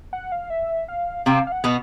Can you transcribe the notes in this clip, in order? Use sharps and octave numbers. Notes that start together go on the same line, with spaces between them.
F#5
F5
E5
F5
C3 C4 F5
F5
F#5
B2 B3